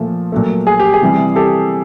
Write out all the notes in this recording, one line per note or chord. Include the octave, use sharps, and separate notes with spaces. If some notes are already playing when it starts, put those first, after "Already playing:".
Already playing: A#2 F3 A3
A#2 F#3 A3
G#4
G4
G#4
C3 E3 G3
G4 A4